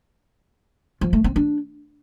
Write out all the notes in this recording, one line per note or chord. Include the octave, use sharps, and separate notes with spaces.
F3
A3
C4
D4